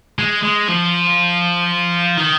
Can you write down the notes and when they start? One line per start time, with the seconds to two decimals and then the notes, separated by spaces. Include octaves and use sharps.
0.19 G#3
0.43 G#3
0.68 F3
2.17 D#3